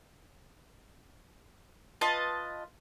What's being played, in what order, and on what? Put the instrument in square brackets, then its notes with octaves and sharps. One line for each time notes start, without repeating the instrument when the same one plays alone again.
[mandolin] F4 B4 D#5 A5